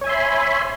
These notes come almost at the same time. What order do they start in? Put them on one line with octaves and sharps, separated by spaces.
C#5 G#5 E5 C6 B5